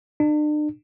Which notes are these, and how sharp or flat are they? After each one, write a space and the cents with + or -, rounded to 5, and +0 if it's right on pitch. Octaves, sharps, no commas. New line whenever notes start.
D4 +40